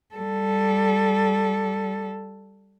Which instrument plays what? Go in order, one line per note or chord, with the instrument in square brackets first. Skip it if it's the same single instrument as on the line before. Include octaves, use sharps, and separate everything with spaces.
[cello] G3 A4